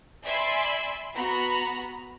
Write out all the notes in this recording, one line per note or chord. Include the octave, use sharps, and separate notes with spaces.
D5 E5 G#5 B5 C6 E6
B3 F#4 A#5 B5